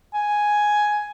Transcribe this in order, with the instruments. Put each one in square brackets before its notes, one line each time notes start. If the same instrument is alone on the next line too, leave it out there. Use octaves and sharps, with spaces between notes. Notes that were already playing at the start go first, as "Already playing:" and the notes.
[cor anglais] G#5